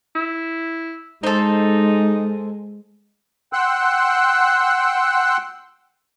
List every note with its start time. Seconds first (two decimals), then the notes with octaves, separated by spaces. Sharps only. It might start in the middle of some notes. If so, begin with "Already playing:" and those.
0.15 E4
1.23 G#3 D#4 A4 C5
3.53 F#5 G5 C6 E6 F#6